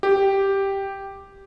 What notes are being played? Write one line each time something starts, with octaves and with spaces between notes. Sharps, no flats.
G4